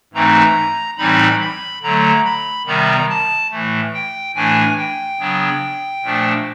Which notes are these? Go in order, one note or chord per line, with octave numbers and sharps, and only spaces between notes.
G#2 E3 A3 C4 D#4 A#5
A2 E3 G3 C4 D#4 B5
B5
D3 F#3 A3 A#5
B5
C3 D#3 G3 B3 A#5
A5
A2 E3 A3
G5
A2 E3 A3 D4 G#5
G5
C#3 F#3 B3 D4
A#2 F3 A3 D4